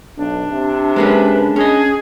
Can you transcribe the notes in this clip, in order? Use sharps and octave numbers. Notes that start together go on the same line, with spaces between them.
B1 D4
C3
G#3 A#3 C#4 B4
C#4 G#4 D#5